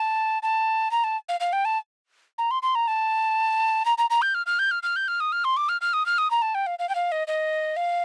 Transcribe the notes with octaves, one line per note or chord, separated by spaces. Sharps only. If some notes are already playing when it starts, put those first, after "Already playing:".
Already playing: A5
A5
A#5
A5
F5
F5
G5
A5
A#5
C6
C6
A#5
A5
A#5
A#5
A#5
G6
F6
F6
G6
F6
F6
G6
F6
D#6
F6
C6
D6
F6
F6
D#6
F6
D#6
A#5
A5
G5
F5
F5
G5
F5
D#5
D#5
F5